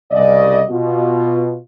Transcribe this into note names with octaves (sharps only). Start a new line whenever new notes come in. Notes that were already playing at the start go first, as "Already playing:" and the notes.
C2 C#3 D5 D#5
B2 F4